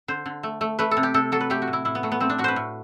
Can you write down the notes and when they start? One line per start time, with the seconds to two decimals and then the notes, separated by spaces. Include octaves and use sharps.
0.08 D3 C5
0.26 D3
0.43 A3
0.61 A3
0.79 A3 B4
0.91 A4
0.97 C3
1.03 G4
1.14 C3 A4
1.32 F#3 A4
1.41 B4
1.50 A3 G4
1.62 F#4
1.67 A2
1.73 E4
1.85 A2 E4
1.95 B3
2.03 F#3 A3
2.12 B3
2.20 A3 C4
2.30 D4
2.38 A2 F#4
2.44 B4 C5
2.56 A2